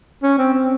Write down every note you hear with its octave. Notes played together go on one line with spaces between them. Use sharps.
C#4
C4
C4